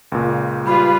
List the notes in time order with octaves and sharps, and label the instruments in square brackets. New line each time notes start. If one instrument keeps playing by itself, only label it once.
[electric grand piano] C#2 A#2
[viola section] G3 F4 B4 [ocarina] B5